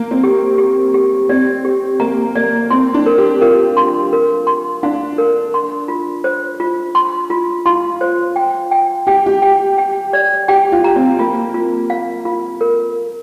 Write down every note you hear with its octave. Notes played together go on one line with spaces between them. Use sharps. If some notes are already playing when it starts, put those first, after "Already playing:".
Already playing: A#3
C4
G4
G4
G4
C4 D5
G4
A#3 A#5
A#3 D5
C4 C6
D4
A#4
G4
F4 A#4
C6
A#4
C6
D4 F5
A#4
C6
F4
C5
F4
C6
F4
F4 C6
C5
G5
G5
G4 G5
G4
G5
G5
D5
G4 G5
F4
A#5
C4
A#3 F4
F4
F5
F4
A#4